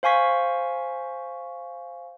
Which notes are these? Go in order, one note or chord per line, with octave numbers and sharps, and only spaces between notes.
C5 F5 G#5 C#6 B6